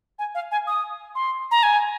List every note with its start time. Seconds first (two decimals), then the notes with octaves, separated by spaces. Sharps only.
0.19 G#5
0.35 F5
0.51 G#5
0.67 D#6
1.15 C6
1.51 A#5
1.63 G#5